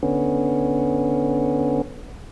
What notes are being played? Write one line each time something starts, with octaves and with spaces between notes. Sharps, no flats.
D3 B3 C#4